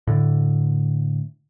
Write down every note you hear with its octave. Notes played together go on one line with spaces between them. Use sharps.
A2 D3